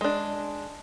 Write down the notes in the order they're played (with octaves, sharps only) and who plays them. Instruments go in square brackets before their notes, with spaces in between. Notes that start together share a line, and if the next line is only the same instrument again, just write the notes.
[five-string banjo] G#3 D4